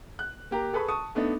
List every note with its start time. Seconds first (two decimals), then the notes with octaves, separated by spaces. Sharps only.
0.19 F#6
0.51 A#3 G4 A#5
0.73 G#4 A4 B4 B5 C#6
0.88 A5 C#6 D#6
1.15 A3 B3 D4 D#4